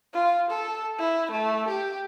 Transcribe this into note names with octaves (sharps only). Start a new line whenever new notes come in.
F4
A4
E4
A3
G4